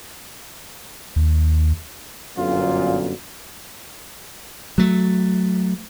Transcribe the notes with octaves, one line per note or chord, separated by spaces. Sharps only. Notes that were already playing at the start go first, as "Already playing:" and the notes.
D#2
G1 F#2 A#2 F4
F#3 A3